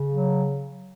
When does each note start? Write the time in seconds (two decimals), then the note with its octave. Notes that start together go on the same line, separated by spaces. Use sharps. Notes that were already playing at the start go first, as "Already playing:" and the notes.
Already playing: C#3
0.13 F#3